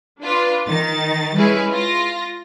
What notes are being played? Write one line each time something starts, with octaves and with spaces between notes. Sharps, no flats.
D4 F4 B4
D#3 A6
G#3 C#4 E4 G#4 B4
F4 A#6